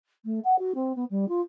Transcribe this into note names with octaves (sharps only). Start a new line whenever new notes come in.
A3
F#5
F#4
C4
B3
G3
F4